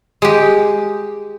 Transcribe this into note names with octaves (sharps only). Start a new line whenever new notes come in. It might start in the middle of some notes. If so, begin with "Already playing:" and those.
G#3 G4